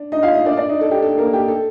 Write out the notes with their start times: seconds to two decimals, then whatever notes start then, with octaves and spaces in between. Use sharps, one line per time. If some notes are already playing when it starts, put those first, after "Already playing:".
Already playing: D4
0.12 D#4 D#5
0.23 F4 F5
0.34 D#4 D#5
0.45 D4 D5
0.57 D4 D5
0.69 D#4 D#5
0.81 A4
0.91 G4
1.02 A4
1.18 A#3 A#4
1.33 G4
1.48 A4